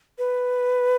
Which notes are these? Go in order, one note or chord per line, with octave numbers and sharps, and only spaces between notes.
B4